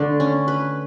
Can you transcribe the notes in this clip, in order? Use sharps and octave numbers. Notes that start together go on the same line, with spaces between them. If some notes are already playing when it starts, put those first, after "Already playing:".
Already playing: D3 A3 D4
C#4
B4